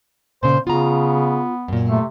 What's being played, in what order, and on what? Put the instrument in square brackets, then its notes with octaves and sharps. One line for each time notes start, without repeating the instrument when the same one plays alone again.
[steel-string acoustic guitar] A#2 C#3 [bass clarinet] C5
[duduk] C#3 [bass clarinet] B3 [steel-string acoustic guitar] F4 A#5
[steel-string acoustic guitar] F#2 A#2
[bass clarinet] C3 [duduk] A3